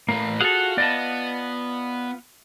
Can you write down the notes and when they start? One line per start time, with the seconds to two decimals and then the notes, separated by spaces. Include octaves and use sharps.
0.09 A2 A#3 B4
0.41 F4 F#4 G#4 A4 F5 F#5
0.78 B3 D5 D#5 A5